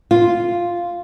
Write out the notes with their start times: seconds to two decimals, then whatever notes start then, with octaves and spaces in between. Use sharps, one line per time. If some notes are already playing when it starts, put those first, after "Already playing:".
0.11 F4